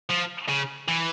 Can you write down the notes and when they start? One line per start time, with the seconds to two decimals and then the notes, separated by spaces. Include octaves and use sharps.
0.09 F3
0.49 C#3
0.88 E3